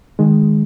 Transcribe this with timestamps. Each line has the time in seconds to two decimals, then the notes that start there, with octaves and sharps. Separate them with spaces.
0.19 D#3 G#3